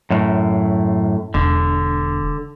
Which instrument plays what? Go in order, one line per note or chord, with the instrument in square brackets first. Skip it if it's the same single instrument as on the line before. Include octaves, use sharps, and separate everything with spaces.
[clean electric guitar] F#2 A2
[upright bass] E1 [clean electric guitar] D3